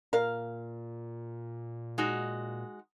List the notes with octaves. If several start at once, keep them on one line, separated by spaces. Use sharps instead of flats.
A#2 A#4 F5
G#3 D#4 F#4